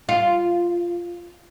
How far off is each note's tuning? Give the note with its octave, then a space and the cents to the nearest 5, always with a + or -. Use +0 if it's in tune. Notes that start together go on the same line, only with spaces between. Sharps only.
F4 -10